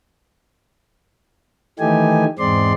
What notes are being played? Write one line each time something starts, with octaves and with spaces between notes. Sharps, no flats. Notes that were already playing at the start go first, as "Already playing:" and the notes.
D#3 E3 A3 D#4 G4 G#5
E2 G#2 G#3 C4 D5 C6